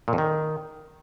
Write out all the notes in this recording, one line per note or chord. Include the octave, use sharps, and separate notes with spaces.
A#2
F2
D#3